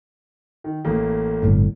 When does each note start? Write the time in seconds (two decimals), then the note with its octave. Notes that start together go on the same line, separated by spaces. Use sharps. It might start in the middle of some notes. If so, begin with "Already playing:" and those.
0.64 D#3
0.85 A1 A3 A#3
1.42 G1 A2